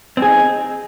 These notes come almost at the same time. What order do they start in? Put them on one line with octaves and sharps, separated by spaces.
C4 G#4 D#4